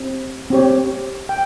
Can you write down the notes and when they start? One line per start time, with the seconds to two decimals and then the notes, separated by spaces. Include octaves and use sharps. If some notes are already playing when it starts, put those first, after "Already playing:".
Already playing: C4 G4
0.50 C4 G4 C#5
1.29 G5